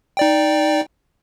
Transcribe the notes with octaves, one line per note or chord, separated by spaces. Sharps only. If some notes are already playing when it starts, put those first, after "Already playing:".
D#4 D5 G5